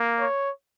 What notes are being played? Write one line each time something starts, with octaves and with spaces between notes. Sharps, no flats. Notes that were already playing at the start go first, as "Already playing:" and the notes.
Already playing: A#3
C#5